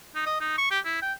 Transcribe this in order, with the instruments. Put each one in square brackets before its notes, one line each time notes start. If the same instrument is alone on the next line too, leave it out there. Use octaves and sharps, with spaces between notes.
[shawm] D#4
D#5
D#4
C#6
G4
E4
G5